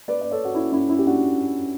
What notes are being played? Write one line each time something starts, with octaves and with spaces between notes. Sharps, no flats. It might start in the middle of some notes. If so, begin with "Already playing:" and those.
B4 D5
D5
A4 C#5
F#4
C#4 E4
C#4 E4
C#4 E4
G4
D4 F#4